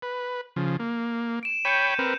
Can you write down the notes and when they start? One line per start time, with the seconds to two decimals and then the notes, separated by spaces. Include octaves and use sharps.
0.02 B4
0.56 C#3 F3
0.80 A#3
1.43 D7 E7
1.65 C#5 G5 B5 G6 C#7 D#7
1.99 C4 A#4 B4